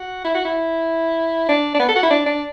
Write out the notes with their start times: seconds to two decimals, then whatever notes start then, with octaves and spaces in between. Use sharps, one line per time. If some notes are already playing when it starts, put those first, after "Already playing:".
Already playing: F#4
0.25 E4
0.35 F#4
0.45 E4
1.49 D4
1.75 D4
1.79 B3
1.88 A4
1.95 F#4
2.03 E4
2.11 D4
2.26 D4